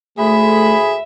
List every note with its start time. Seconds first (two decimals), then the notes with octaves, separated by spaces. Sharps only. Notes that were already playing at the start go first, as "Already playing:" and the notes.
0.18 D2 G#3 A3 G#4 E5 B5